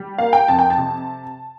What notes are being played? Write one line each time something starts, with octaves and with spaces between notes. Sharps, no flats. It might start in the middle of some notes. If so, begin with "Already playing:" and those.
Already playing: G3
A#3 F5
G5
F2 A5
G5
A5
C3